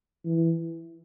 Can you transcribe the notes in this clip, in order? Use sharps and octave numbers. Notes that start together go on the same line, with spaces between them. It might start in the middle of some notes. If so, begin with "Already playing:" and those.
E3